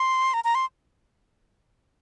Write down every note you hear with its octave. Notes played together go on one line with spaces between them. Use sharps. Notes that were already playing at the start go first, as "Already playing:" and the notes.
Already playing: C6
A#5
A#5
C6